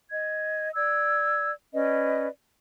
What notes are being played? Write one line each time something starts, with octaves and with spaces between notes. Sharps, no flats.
D#5 G#6
D5 E6 G#6
C#4 B4 D5 D#5